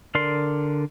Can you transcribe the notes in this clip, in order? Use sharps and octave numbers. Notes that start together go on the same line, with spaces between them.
D3 A#4 D5 C6